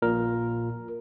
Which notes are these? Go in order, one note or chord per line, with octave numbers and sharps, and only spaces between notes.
A#1 A#2 A#4